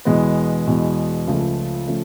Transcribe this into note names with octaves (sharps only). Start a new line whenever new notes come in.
E2 B2 G#3 B3
E2 B2 G#3 B3
C#2 C#3 F3 A3
C#3 F3 A3